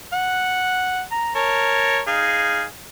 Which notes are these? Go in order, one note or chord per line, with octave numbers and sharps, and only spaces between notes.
F#5
A#5
A#4 C#5 A5
D#4 G#4 F5